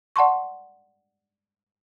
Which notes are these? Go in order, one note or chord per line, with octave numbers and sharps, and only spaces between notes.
D5 F#5 A5 C6 C#6